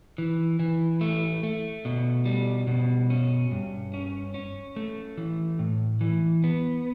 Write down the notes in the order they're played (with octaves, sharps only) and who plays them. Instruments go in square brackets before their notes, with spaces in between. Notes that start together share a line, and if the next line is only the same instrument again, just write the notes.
[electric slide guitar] E3
E3
A3
A3
B2
G3
B2
C#4
G2
C#4
C#4
A3
E3
A2
E3
B3